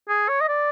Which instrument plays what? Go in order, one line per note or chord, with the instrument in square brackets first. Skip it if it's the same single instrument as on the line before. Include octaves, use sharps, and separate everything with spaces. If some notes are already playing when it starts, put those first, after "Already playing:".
[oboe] G#4
C#5
D#5
D5